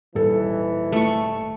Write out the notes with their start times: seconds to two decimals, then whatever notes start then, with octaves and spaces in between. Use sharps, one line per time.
0.15 D#1 E3 A4
0.92 A3 C#6